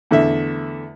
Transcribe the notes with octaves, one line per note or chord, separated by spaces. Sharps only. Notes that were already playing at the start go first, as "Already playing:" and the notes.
E2 D3 A3 E5